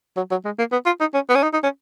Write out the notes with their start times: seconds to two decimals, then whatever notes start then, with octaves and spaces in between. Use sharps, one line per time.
0.17 F#3
0.31 F#3
0.45 G#3
0.59 A#3
0.72 B3
0.86 F4
1.00 D#4
1.14 C#4
1.29 B3
1.35 C#4
1.43 D#4
1.53 D#4
1.63 C#4